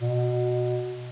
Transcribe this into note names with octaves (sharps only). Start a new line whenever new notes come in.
B2